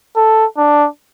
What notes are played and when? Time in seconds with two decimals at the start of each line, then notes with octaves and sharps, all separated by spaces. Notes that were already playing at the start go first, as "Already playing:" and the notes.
0.16 A4
0.57 D4